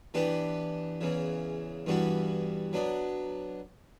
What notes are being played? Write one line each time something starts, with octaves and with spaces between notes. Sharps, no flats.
E3 B3 D4 G4 B4
E2 C#3 E3
G2 E3 G3 B3 F#4
F#3 B3 D4